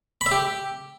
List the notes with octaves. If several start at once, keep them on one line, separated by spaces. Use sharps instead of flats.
B5
E5
G4